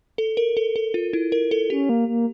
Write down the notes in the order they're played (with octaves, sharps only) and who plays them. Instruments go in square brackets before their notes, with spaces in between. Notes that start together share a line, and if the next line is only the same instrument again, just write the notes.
[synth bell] A4
A#4
A4
A4
F4
E4
A#4
A4
[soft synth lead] C#4 [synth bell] G4
[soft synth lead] A#3
A#3